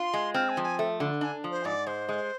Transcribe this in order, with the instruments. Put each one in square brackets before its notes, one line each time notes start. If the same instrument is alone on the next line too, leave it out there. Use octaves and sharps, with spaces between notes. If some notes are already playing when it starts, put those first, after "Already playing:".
Already playing: [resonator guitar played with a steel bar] F4 [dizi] C6
[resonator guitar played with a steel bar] G#3
[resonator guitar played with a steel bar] C4 [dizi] F6
[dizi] G#5
[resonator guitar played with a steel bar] F3
[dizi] G#5
[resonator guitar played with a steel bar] A3
D3
[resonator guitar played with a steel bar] D4 [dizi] G#5
[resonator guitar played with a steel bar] F3
[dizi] C5
[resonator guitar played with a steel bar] G#2 [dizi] D5
[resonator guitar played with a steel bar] G#3 [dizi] C5
[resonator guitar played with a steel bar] G#3